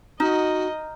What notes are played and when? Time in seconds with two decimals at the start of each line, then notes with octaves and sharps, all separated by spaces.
0.20 D#4 F#4 D#5 A#5 F6 G6